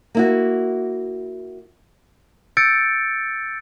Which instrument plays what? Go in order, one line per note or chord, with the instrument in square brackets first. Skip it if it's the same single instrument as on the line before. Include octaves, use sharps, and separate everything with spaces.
[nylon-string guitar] A#3 E4 F#4
[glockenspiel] E6 G6 A6 C#7 D7